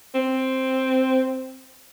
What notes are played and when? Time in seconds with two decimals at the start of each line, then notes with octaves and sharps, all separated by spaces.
0.15 C4